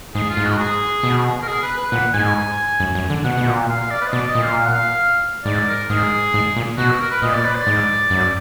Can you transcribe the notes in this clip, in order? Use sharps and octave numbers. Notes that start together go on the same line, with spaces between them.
G#2 G#4
F4
G#2
F#4
G#4
B2
A#4
G#4
B4
B4
A#2 F#5
G#2 G#5
F#2
F#2
D3
B2 F#5
B2
A#2
F5
F5
D5
B4
D#5
B2 D5
D#5
A#2
F5
F5
F#5
F5
G#2 D5
A#4
G#2 G#4
G#2
A#2
B2 F#4
F#4
A#4
B4
A#2 D#5
D5
B4
D5
G#2
F#2